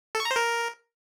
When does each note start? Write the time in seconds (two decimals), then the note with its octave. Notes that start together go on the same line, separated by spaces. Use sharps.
0.15 A4
0.20 C#6
0.25 A#5
0.31 C5
0.36 A#4